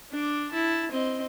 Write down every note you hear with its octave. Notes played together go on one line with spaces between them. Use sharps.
D4 D6
E4 A5
C4 D#5